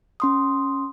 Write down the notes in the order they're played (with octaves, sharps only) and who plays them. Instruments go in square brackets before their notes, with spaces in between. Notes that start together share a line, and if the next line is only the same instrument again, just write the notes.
[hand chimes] C#4 C6 D#6